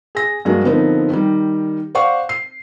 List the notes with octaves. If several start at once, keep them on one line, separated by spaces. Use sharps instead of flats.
G#4 A#6
G2 F#3 G#3 A#3
D3 F3 B3 C4 D#4 A#4
D#3 G3
C5 D5 F5 F#5 C#6
C7